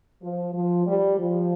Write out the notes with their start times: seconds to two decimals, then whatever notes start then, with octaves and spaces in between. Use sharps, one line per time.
0.22 F3
0.53 F3
0.86 G3
1.18 F3